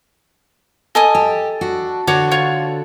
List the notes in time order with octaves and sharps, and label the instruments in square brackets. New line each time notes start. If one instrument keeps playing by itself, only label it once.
[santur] A4 [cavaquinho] D#5 G#5 D#6
[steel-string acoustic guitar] G4
D4 F#4
[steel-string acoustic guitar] D3 D4 F#4 [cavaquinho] C#5 D6
[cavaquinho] F4 C#5 C#6